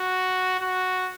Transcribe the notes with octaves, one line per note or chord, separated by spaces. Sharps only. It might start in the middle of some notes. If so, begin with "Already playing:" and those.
Already playing: F#4
F#4